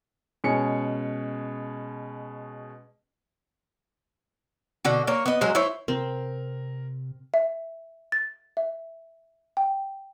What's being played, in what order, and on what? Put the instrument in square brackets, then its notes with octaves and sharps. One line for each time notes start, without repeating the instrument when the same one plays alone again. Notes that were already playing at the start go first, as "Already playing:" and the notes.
[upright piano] B2 G#3 C#4 C#7
[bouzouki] B2 D3 F#4
A#3 C#5
B3 D#5
F#3 G#3 C#4 C5
E4 C5 C#5
[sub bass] C3 [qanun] C4 [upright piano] A#4
[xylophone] E5
A6
E5
G5